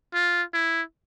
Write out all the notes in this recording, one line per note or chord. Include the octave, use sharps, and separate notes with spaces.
F4
E4